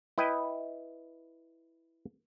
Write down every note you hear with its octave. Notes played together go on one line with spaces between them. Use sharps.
E4 B4 D#5 G5